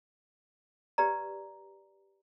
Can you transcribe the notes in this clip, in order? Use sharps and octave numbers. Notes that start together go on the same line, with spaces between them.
G4 B4 D5 A#5